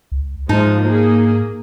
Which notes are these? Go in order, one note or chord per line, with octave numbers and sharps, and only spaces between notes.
C#2
G#2 F3 G#3 D#4 A5
A#3 G#4